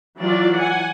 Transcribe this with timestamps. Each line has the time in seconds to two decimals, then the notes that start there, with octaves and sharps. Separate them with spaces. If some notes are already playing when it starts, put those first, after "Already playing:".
0.17 E3 F#3 F4 D5
0.55 F#5 G#5